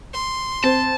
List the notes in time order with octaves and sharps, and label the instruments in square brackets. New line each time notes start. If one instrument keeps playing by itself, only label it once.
[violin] C6
[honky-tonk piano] C4 [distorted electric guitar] A5